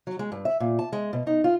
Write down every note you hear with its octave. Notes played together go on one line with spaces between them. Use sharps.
F#3
G#3
G2
E5
A#2
A5
G#3
B2
D#4
F4